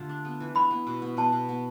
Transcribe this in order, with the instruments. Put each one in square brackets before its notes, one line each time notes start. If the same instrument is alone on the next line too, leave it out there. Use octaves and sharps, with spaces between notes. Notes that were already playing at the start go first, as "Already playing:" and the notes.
Already playing: [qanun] D3 A3 F4 G4
D4
B3
E3
[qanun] E4 [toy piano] B5
[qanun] B3
B2
B3
[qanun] B2 [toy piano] A5
[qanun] B2
B3